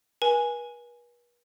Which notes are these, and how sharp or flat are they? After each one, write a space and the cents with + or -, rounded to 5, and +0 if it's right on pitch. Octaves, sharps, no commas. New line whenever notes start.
B4 -45 G#5 +0